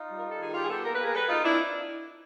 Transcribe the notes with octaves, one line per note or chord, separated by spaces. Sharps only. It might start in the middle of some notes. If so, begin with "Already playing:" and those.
Already playing: D#4 F4
G3
A#4
G3 A4
D#3 G#4
G3 F4 G4
G#4
B3 G4 A4
A#3 A#4
B4
A#3 G#4 A#4
G3 A4 B4
B2 D#4 F4
C4 D4 E4